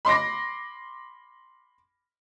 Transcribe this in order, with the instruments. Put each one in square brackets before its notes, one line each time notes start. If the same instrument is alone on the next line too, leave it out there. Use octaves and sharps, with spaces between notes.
[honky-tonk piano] B5 C6 D6 A#6